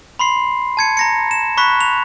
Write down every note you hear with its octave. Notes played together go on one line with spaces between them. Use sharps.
B5 C6 C7
A5 G#6 C#7
A#5 A#6 C#7
E7
B5 C#6 F#6 B6
F7